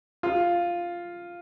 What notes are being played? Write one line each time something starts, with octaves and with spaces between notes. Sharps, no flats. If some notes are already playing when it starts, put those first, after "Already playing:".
F4